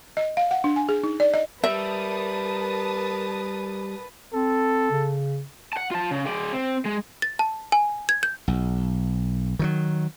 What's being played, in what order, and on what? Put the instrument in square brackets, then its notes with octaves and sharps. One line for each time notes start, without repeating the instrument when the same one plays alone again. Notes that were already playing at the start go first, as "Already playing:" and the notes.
[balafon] D#5
F5
F#5
D4
G#5
G#4
D#4
D5
D#5
[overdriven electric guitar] G3 [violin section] A#4 A5 D#6 [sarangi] B4 [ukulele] E5
[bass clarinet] C4 [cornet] A4
[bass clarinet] C#3
[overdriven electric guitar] F#5 A5
F4 A5
C#3
G#3 D5
C4
G#3
[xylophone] A6
A5
G#5
G#6
G6
[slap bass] B1
D#3 E3 F#3